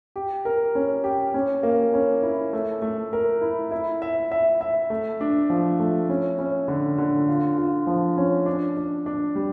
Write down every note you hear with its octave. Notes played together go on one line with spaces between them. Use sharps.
G4
A#4
C#4
G4
C#4
A#3
C#4
E4
A3
A3
A#4
E4
E4
E5
E5
E5
A3
D4
F3
A3
C#4
C#4
D3
D3
F4
F4
F3
C#4
D4
D4
D4
G3